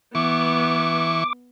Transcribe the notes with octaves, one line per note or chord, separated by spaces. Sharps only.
E3 B3 C#6 D6